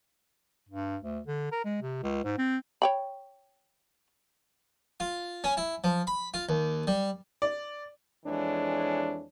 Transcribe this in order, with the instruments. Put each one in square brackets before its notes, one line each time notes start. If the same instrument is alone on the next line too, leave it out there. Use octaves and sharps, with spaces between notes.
[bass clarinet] G2
D2
D3
A#4
G#3
C3
C#2
G#2
C4
[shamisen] C#5 G5 B5
[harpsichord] F4
C#4
E4
F3
B5
F4
D#2
G3
[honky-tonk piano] D5
[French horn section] F2 E3 G#3 D4 C#5